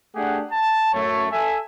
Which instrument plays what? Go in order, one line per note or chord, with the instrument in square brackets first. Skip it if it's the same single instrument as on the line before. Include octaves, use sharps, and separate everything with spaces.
[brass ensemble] A3 D4 G4 G#4 F#5
A5
F#2 A3 C#5
A4 E5 G#5